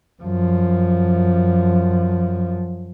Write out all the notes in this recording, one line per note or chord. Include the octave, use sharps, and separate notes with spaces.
F#2 F3